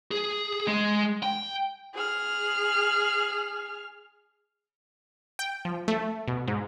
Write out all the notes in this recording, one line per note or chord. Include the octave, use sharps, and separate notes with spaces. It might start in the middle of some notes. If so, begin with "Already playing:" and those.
G#4
G#3
G5
G#4 F6
G5
F3
A3
B2
G#2